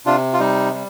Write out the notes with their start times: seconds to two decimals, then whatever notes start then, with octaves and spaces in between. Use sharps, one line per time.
0.06 C3 D4 F4
0.33 F4
0.39 G3 D#4
0.73 G3